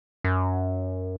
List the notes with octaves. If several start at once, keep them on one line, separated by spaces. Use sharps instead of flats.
F#2